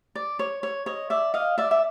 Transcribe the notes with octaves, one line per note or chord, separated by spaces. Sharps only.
D5
C#5
C#5
C#5 D#5
D5 E5
D#5 F5
D5 E5
E5